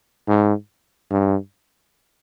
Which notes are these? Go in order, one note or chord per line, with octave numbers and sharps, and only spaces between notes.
G#2
G2